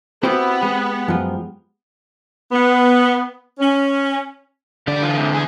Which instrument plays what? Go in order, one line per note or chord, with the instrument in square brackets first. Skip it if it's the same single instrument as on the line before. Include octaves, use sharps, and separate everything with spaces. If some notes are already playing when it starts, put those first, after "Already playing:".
[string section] B3 [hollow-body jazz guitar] C4 C5 [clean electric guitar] E4 F#4 G4
[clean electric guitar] G#3 G4
[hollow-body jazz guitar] F#2 F3
[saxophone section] B3
C#4
[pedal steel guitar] D3 [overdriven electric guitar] G3 D5
[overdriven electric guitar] E3 F4
G#2 C3
E3 G#4